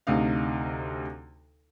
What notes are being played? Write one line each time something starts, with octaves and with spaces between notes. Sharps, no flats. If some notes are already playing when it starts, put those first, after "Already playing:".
D2 C3 D#4 F5